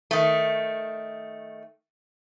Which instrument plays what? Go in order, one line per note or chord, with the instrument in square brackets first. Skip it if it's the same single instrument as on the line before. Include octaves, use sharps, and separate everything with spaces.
[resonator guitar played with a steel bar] D#3 A3